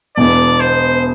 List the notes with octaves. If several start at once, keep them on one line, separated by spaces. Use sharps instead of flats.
E1 E2 B2 D5
C5